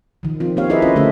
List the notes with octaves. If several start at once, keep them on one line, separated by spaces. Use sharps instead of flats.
D#3 F3
C4 F4
A#3 C4 G4 C#5 F5
E4 G#4 A#4 B4 D#5 E5
C#4 F4 C5 D#5
D3 A3 C#4 G4 A4 E5